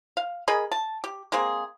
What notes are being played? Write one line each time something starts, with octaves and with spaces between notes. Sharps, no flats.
F5
G#4 A#4 D#5 B5
A5
G4
G#3 A#3 C4 G#4